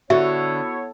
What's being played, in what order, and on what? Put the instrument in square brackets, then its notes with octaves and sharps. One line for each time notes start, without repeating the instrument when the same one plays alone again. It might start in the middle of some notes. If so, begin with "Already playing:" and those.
[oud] D3 [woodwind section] B3 E4 C#5 [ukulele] F#4 [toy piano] E5